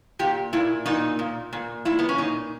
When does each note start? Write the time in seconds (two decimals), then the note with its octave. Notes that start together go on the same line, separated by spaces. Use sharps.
0.19 A#2 G4
0.53 A#2 E4
0.86 A#2 D#4
1.19 A#2
1.53 A#2
1.85 A#2 E4
1.99 B3
2.09 C#4
2.18 A#2 D#4